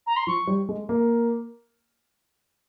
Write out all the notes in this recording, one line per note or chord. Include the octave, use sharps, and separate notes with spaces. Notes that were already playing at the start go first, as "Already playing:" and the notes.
A#5
C6
F3 C#6
G3
G#3
A#3